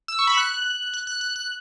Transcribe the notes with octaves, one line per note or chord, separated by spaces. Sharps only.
E6
C#6
B5
F#6
F#6
F#6
F#6
F#6